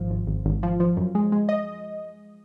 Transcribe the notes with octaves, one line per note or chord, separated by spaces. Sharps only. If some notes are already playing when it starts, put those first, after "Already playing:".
Already playing: G#1 F3
G#1
G#1
G#1
F3
F3
F#2
G#3
G#3
D#5